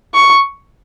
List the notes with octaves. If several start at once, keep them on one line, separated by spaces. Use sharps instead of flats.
C#6